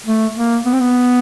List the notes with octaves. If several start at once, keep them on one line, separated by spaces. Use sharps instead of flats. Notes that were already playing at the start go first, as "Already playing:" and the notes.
A3
A#3
B3
C4
B3